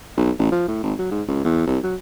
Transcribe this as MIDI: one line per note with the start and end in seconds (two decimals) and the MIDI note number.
0.17 0.31 35
0.39 0.48 33
0.52 0.68 53
0.68 0.82 45
0.83 0.94 32
0.99 1.08 54
1.11 1.22 44
1.28 1.44 37
1.45 1.64 40
1.67 1.78 36
1.83 1.95 54